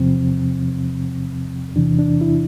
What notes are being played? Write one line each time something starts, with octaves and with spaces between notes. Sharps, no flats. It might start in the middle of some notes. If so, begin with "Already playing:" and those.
Already playing: E2 C3 F3 C4
E2 C3 E3 D4
D4
E4